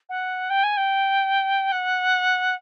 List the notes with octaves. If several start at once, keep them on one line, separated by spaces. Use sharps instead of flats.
F#5
G5
G#5
G5
F#5